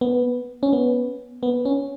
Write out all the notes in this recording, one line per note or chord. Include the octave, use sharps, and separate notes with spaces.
B3
C#4
B3
B3
C#4